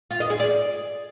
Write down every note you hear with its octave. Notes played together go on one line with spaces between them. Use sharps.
F4
D#5
G#4
D5